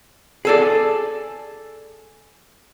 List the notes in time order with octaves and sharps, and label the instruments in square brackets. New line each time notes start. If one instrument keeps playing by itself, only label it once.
[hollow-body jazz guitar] G#4 A4 D5